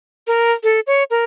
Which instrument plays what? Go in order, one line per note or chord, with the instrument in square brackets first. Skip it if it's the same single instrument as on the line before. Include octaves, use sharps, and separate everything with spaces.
[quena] A#4
A4
C#5
A#4